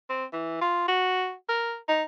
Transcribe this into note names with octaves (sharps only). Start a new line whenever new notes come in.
C4
E3
F4
F#4
A#4
D#4